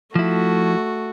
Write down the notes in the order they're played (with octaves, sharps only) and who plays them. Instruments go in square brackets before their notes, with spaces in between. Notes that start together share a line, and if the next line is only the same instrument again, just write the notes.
[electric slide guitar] F3 E4 [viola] A3 F#4